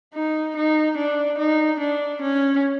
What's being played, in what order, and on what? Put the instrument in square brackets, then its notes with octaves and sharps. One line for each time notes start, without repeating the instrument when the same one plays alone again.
[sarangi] D#4
D#4
D4
D#4
D4
C#4